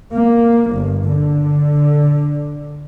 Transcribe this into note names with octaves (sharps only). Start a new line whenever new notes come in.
A#3
G1
D3